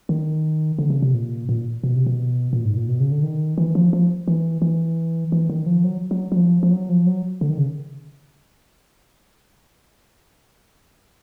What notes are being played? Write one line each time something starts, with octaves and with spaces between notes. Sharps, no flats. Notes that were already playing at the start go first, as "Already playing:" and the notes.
D#3
D3
C#3
C3
A#2
A#2
B2
C3
B2
A#2
G#2
A#2
B2
C#3
D3
D#3
E3
F3
F3
E3
E3
E3
D#3
F3
F#3
F#3
F#3
F3
F3
F#3
F3
F#3
D3
D#3
C#3